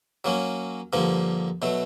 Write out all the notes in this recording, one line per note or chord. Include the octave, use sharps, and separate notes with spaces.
F#3 A#3 C#4
G2 D3 F3 A#3
B2 F#3 A3